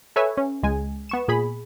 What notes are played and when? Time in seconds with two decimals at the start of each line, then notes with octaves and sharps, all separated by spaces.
0.16 A4 B4 C#5 E5 G#5
0.37 C#4
0.63 C#2 G#3 G#5
1.09 B3 C#6 E7
1.28 A#2 G#4 B5